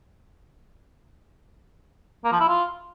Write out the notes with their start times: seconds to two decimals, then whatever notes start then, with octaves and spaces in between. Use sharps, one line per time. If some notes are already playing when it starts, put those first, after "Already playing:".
2.24 A#3
2.32 F3
2.40 E4
2.48 F4